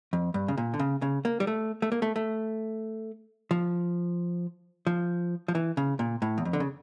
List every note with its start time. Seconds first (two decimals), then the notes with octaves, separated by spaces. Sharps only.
0.13 F2
0.34 G2
0.48 C#3
0.57 A#2
0.74 D3
0.79 C#3
1.02 C#3
1.25 A#3
1.40 G3
1.47 A3
1.82 A3
1.92 A#3
2.02 A3
2.16 A3
3.51 F3
4.87 F3
5.48 F3
5.55 E3
5.77 C#3
5.99 A#2
6.22 A2
6.38 E2
6.45 F2
6.53 D3
6.60 C#3